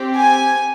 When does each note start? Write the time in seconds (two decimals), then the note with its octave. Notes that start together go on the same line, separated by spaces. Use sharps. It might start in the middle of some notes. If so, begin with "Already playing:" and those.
Already playing: C4 G4
0.17 G#5